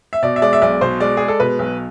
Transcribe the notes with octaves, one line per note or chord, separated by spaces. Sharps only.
E5
B2 D5
E5
G#3 D5
E5
B1 D5
B2 C5
G#3 D5
G#3 G#4
A4
B2 B4
B1